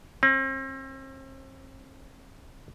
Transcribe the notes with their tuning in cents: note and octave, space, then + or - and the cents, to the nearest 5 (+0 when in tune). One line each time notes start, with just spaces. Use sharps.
C4 +40